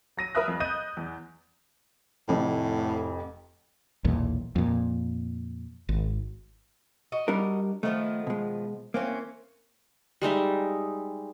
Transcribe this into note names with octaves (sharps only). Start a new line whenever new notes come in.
F#3 A#6 D#7
A#4 B4 E5 D#6 F#6
F2
D#5 D#6 F#6 G6 A6 D#7
E2
F1 F2 A2
B1 E2 A#2
F2 A#2
G#1
F#4 D#5
G3 D4 A#4
D#3 F3 A3 B3
B2 G#3
E3 A#3 C4 C#4
G3 G#3 D#4 E5